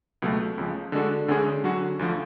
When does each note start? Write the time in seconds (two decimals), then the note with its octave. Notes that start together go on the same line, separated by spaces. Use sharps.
0.22 C#2 B2 F#3 A3
0.58 C#2 C#3 F3
0.92 D3 G#3 D4 F#4 A4
1.28 D2 D3 G#3 C#4 G#4
1.64 D3 F#3 C#4 F#4
1.99 D2 D3 F3